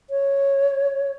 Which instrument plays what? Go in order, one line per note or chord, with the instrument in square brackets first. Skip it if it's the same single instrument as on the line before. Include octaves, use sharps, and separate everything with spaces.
[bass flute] C#5